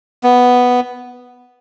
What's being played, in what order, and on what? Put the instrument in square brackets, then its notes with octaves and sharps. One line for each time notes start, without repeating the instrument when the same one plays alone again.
[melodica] B3